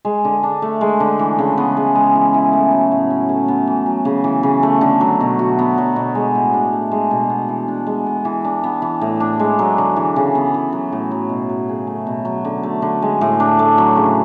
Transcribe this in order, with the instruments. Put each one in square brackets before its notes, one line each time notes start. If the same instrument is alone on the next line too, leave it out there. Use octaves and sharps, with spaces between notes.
[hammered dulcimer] G#3
D3
D4
A3
G#3
D3
E3
C#3
B3
G#3
G#3
E3
E4
A3
F#3
A2
C#4
A3
B3
E3
F#3
C#3
E3
C#3
A3
D3
F#3
B2
F#4
B3
F#3
B2
G#3
A2
D4
A3
G#3
B2
B3
E3
D4
G#3
B3
E3
D4
B3
E3
A2
D4
G#3
F#3
D3
E3
C#3
B3
E3
F#3
A2
F#3
B2
F#3
C#3
A3
B2
F#3
D3
A3
D3
G#3
A2
D4
A3
F#3
C#3